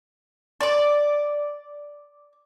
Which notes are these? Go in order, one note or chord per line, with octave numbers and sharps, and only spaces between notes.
D5 D6